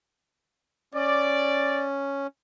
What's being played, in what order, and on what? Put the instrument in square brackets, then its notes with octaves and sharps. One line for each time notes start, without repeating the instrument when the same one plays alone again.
[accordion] C#4 [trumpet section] D5